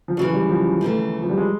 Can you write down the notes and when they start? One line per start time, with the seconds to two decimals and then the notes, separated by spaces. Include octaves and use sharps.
0.08 F3
0.17 F#2 C#3 E3 F#3
0.33 G3
0.50 F3
0.81 D#2 C#3 E3 A3
1.22 F3
1.30 G3
1.38 G#3